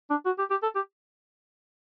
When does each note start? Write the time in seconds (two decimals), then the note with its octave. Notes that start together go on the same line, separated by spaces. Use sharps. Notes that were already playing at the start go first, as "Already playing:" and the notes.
0.10 D4
0.26 F#4
0.39 G4
0.50 G4
0.62 A4
0.75 G4